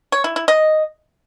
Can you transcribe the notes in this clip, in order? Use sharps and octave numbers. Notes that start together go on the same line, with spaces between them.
C#5
E4
E4
D#5